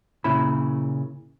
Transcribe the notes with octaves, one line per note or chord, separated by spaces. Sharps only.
A#2 C#3 E4 B5